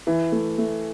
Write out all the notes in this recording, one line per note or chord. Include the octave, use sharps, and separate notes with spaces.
E3
A3
A3